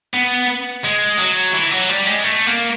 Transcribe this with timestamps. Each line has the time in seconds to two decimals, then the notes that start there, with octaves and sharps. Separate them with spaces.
0.14 B3
0.84 G#3
1.18 F#3
1.54 E3
1.71 F#3
1.89 G3
2.07 G#3
2.24 A3
2.48 A#3